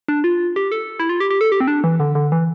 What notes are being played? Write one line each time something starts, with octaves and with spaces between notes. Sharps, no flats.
D4
F4
G4
A4
E4
F4
G4
G4
A4
G4
C4
D4
E3
D3
D3
E3